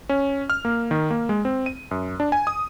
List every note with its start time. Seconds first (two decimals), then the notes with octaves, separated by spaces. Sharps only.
0.09 C#4
0.50 F6
0.65 A#3
0.91 D#3
1.10 A#3
1.29 G#3
1.45 C4
1.66 D#7
1.91 F#2
2.20 D4
2.32 G#5
2.47 D#6